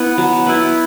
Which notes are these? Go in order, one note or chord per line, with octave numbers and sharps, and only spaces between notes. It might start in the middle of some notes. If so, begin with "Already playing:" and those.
Already playing: B3 E4
F#3
B3 E4